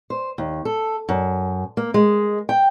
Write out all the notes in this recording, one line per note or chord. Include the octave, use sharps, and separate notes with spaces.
C5
D#2
A4
F#2
A#3
G#3
G5